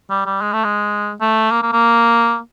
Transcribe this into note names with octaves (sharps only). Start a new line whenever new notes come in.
G3
G3
G#3
A3
G#3
A3
A#3
A#3
A#3